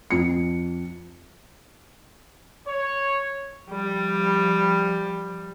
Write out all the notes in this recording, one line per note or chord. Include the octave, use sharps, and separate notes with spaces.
F2 C#7
C#5
F3 G3